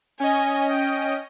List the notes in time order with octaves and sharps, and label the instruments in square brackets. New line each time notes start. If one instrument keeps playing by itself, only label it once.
[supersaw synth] C#4 D#5 [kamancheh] G#5
[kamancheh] G5